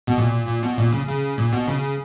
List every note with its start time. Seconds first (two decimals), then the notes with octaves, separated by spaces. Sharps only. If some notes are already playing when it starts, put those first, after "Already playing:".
0.07 B2
0.18 A#2
0.47 A#2
0.63 B2
0.78 A#2
0.92 C#3
1.08 C#3
1.38 A#2
1.53 B2
1.68 C#3